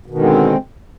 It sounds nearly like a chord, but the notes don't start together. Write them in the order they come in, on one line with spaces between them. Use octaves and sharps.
B2 D#3 D3 G#3 C4